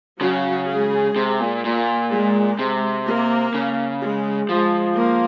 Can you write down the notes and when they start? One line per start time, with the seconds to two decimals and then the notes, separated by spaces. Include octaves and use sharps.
0.21 C#3 F#3 F#4
0.69 G#3 G#4
1.16 C3
1.40 A#2
1.64 A#2 A#3
2.11 G#3
2.59 C3
3.07 A#3
3.54 C#3
4.03 G#3
4.49 F3 G#3
4.97 A#3